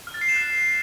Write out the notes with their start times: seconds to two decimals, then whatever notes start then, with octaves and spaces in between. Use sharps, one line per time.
0.07 F6
0.14 A6
0.21 C7
0.29 E7
0.36 F#6